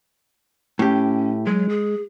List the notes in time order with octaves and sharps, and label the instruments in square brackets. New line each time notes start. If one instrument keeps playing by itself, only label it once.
[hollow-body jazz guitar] A2 G4 [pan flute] C#4
[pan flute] F#3 [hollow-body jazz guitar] G#3
[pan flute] G#4